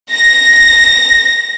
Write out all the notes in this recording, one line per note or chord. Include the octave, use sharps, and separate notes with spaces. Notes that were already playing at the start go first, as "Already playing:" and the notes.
A#6